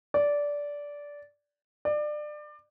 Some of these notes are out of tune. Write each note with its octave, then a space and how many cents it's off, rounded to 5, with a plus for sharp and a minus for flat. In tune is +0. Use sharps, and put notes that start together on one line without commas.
D5 -15
D5 +25